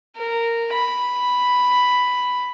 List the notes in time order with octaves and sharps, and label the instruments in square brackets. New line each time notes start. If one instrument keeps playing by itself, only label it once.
[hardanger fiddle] A#4
B5